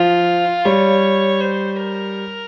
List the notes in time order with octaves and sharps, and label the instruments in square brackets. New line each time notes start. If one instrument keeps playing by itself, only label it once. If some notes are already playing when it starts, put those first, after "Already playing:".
Already playing: [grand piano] F3 [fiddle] F4
[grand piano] G3 [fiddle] C#5
[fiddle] C5
A#4